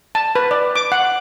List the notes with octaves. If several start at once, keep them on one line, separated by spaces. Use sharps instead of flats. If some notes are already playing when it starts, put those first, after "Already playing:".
A5
B4
D5
D6
F#5